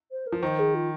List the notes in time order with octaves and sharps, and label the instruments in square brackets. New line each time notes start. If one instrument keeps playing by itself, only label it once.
[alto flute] C5
A#4
[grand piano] F3
[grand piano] D#3 [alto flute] C5
[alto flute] G#4
F4